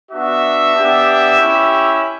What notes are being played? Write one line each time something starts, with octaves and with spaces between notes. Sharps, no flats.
B3 D4 F#4 E5
B3 D4 G4
C#4 E4 G4